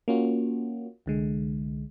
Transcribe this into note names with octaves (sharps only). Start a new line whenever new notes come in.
A#3 C#4 F4 F#4
C2 D3 G#3